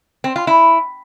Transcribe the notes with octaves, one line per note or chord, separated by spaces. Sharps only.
C4
F4
E4